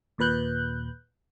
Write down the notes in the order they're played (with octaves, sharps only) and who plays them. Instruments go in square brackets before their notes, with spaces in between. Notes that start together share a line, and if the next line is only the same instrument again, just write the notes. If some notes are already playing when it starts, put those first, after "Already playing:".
[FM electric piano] D#2 A#2 B4 F#6 G6